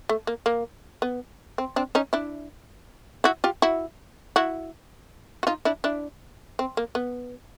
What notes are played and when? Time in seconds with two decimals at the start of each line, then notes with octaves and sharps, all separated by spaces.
0.09 A3
0.27 A#3
0.46 A#3
1.02 B3
1.58 C4
1.76 C4 D4
1.95 C#4 D#4
2.13 D4 E4
3.24 E4 F#4
3.44 F4 G4
3.62 E4 F#4
4.36 E4 F#4
5.43 F#4
5.47 D#4 F4
5.65 D4 E4
5.84 D4 E4
6.59 C4
6.77 A#3
6.95 B3